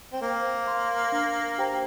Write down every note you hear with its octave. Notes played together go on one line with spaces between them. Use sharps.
C4
A#3 C5
F5 C6
D4
G4 C5 G5 A#5